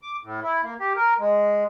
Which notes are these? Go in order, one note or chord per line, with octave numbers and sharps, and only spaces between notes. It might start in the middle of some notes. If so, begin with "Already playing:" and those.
D6
A2
E4
A#3
G4
A#4
G#3